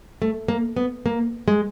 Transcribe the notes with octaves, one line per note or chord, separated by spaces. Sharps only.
A3
A#3
B3
A#3
G#3